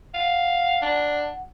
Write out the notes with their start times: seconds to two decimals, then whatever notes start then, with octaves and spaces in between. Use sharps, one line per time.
0.14 F5 F#5
0.82 D4